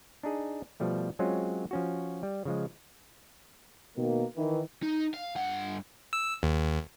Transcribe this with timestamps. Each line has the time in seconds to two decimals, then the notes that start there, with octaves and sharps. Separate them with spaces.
0.23 D4 D#4 G#4
0.80 B2 F3 G3 A3
1.19 F#3 G#3 C4 C#4 F4
1.71 F3 C#4 F#4
2.23 G3
2.45 C#3 F3 G#3
3.96 B2 D#3 A#3
4.37 D#3 E3
4.83 D#4
5.14 F5
5.35 G2 F#5
6.13 E6
6.43 D#2